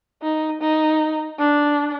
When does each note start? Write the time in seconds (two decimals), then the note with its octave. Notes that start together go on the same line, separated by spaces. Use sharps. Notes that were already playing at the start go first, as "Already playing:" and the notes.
0.22 D#4
0.61 D#4
1.38 D4